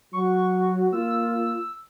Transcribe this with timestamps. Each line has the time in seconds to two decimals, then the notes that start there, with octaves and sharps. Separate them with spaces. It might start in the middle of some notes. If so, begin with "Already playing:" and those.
0.13 F#3 F#4 C#6
0.92 A#3 F4 E6